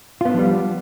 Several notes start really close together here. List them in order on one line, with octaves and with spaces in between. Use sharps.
F4 B3 D4 F3 G3